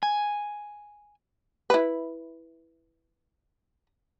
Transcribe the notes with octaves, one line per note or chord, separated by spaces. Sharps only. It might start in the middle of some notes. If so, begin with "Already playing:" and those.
G#5
E4 B4